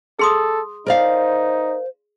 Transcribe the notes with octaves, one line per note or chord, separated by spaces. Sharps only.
G#4 A4 C6 D#6
D#4 A#4 C5 D5 F5